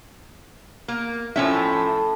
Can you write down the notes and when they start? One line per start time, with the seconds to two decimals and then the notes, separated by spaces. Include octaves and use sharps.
0.88 A#3
1.36 A2 F3 C#4 E5